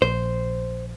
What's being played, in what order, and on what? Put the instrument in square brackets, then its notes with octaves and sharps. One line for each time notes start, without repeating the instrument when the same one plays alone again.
[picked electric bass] A#1 [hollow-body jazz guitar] C5